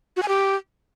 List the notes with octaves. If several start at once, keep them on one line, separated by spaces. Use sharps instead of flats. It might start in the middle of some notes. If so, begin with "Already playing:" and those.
F#4
G#5
G4